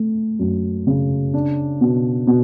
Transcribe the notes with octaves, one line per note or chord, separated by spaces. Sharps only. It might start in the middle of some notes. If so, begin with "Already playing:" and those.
Already playing: A3
F#2
C#3
D4
B2
B2